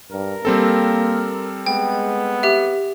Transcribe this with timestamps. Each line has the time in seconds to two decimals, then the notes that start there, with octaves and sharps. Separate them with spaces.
0.12 G2 A#4
0.45 G3 A#3 C4 A4
1.66 G#3 B3 G5
2.43 G4 E5